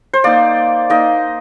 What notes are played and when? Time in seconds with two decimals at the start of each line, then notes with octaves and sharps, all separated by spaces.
0.13 C5
0.24 A#3 D#4 D5
0.90 A#3 D#4 D#5